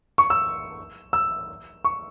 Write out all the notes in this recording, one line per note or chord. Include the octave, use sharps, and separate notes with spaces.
C#6
E6
E6
C#6